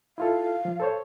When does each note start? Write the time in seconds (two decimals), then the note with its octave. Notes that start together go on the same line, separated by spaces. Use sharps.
0.18 E4 F4 A4 F5
0.65 F3
0.80 A4 C5 C#5